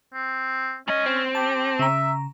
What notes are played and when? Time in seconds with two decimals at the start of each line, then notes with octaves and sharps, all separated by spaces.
0.14 C4
0.88 G#2 C#4 D#5
1.06 C4
1.35 G4 A5
1.79 C#3 E5 A#5